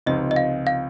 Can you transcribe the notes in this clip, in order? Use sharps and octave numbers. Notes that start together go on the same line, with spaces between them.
C#2 C3 F3 C4 D#4 D#5
D#5
F5
F5